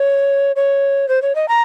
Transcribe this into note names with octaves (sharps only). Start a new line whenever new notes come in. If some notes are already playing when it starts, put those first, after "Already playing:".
Already playing: C#5
C#5
C5
C#5
D#5
A#5